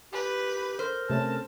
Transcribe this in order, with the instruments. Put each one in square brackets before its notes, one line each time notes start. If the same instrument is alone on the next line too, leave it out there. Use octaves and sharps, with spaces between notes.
[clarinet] G4 [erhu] B4
[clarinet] A#4 [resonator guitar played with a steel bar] C5
[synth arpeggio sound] C3 A3 C#4 [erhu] A5